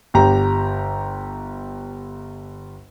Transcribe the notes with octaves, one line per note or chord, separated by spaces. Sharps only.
G1 G4 A#5